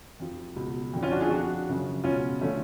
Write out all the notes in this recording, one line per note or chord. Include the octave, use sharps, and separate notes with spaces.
F2 F3
C#2 B2
F2 D3 F3
C#4 F4
D4 F#4
F4 G#4
F2 F3 D4 F#4
F#2 C#3 F3
C#2 B2 C#4 F4
D3 F3 A3 C#4